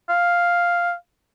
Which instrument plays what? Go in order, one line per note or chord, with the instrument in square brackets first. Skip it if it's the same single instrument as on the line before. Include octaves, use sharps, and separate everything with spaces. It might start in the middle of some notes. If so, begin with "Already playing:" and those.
[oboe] F5